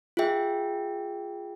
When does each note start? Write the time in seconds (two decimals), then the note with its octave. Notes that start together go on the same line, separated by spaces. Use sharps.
0.17 F4 G#4 E5 G5